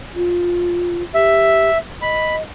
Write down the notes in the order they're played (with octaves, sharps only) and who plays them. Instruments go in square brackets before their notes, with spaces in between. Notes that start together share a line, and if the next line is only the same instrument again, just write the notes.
[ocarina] F4
[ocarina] G4 [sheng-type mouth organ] E5
[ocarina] D#5 [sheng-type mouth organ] B5